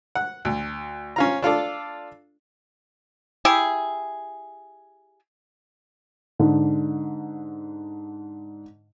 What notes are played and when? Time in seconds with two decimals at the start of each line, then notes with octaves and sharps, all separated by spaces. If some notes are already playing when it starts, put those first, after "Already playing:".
0.15 F#5
0.45 D2
1.16 C#4 F4 A#5
1.42 D4 F4 A4 D5
3.45 E4 G4 G#4
6.39 G#2 D3